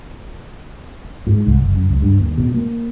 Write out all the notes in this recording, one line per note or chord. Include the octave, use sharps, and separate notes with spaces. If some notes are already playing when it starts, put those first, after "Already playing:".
G#2
C2
F#1
F#2
C#2
G2
D#2
B2
A#3